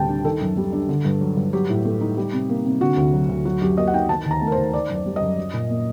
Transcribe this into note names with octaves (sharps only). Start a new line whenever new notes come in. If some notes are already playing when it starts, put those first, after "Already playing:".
Already playing: D2 A2 C3 G3 G5 A5
D4
D#3 A4
F#2
G3
D4
D3
G2
F#3
G2
F#3 G4
A2
A3
D#4
G3
C3
A#3
C3
D3 F#4
D2
F#3
D2
F#3 F#4
F#2 G4
A#3 D#5
F#5
D#4 G5
D#3 A5
D#2
A#5
A3
A#4
C5
D#2
D#3 D5
F#2
D5
G3
D#5
F#2
F#3
A#2
A#3